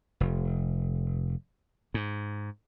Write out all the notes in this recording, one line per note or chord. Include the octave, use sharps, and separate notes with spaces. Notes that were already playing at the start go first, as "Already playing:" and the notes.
F1
G#2